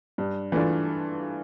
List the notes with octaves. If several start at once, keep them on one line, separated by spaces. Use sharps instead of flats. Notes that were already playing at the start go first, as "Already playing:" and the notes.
G2
E3 A3 D4 F4